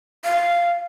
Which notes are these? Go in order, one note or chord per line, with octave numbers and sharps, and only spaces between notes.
F5